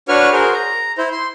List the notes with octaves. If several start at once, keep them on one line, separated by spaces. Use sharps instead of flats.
D4 F#4 B4 C#5 C#6 F6
F#4 G#4 A#4 C5
A#5
E4 C5
C6